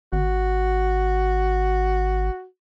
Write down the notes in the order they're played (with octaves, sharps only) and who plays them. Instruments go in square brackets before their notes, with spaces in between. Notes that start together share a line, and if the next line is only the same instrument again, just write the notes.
[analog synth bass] G#1 [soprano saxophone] F#4